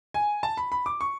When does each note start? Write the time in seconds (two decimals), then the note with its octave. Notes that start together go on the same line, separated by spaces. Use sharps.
0.14 G#5
0.43 A5
0.57 B5
0.72 B5
0.86 D6
1.01 C#6